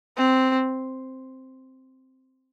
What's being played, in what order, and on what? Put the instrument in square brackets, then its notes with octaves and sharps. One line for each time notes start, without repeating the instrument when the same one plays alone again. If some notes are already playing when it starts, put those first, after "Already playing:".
[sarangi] C4